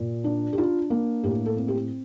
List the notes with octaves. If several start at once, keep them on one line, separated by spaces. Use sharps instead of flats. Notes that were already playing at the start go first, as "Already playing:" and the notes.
Already playing: A#2
D4
G4
D4 F4
A#3
A2 G4
A4
C4
G4